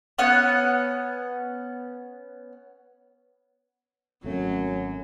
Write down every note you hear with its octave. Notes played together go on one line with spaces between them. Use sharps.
B3 C#4 F#5
G#1 F#2 F#3 A3 C#4